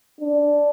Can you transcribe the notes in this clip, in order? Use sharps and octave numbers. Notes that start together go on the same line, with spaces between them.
D4